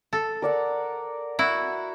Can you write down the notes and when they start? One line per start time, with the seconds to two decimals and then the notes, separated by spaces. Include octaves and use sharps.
0.13 A4
0.42 A#4 D5 F#5
1.39 E4 F#4